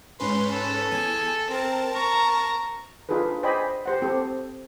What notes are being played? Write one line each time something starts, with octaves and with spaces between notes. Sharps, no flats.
G#2 C#4 B4 C6
A4
E2 G#5
C4 A#4 A5
A#5 C#6
D4 D#4 F4 G#4 A4 B4
C5 D5 D#5 G5 G#5 B5
G4 C5 F#5
C4 G4 A4